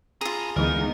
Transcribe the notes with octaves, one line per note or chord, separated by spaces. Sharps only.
F4 G#4 A5 A#5
D2 E3 G#3 B3 D#4 A#4